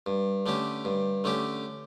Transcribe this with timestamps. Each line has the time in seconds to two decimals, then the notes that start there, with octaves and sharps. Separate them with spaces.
0.06 G2
0.46 D3 A3 C#4 G4
0.85 G2
1.24 D3 A3 C#4 G4